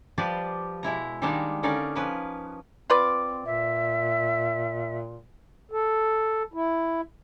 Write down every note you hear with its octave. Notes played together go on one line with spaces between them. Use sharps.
F3 G3 G4 B4 C5 D5
B2 G#3 E4 A#5
D#3 G3 G#3 A#3 D4 D#4
D3 C#4 D#4 A#4 D5 F5
F3 A#3 C#4 B4
C4 F4 B4 D5
A#2 E5
A4
E4